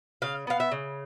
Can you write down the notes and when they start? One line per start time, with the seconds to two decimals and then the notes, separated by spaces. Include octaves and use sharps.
0.22 C#3 F5
0.47 B3 F5
0.60 E5
0.72 C#3